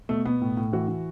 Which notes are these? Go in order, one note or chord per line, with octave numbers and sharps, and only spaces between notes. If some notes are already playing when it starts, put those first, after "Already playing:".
B2 A3
B2 B3
A2
A2
E3 F#4
E3